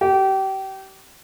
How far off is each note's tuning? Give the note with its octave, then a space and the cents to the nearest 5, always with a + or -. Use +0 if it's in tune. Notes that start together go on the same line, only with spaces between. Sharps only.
G4 -30